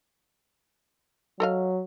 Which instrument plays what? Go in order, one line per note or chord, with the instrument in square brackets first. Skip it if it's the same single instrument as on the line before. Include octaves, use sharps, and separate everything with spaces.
[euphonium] F#3 [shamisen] A4 D#5 F5